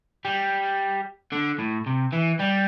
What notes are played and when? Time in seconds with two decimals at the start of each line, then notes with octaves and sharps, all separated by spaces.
0.25 G3
1.32 D3
1.59 A2
1.87 C3
2.13 E3
2.40 G3